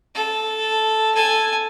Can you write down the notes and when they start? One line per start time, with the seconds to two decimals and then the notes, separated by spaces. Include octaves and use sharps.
0.15 A4
1.15 A4 G#5